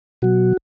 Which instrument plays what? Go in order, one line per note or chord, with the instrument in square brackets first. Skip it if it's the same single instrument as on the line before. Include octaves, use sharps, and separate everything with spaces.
[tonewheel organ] B2 F#3 F#4